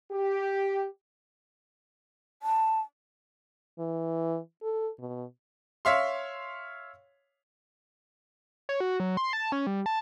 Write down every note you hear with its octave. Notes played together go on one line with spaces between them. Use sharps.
G4
A5
E3
A4
B2
C#5 E5 F5 C6
C#5
F#4
F#3
C6
A5
C#4
G3
A5